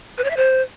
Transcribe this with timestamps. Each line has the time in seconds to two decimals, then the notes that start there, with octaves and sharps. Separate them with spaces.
0.18 B4
0.24 C#5
0.30 E5
0.37 C5